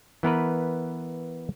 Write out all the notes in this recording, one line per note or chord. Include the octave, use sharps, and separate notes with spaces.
E3 B3 A#4 B4